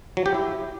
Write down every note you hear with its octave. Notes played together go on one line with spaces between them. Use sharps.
F#3
G4
E4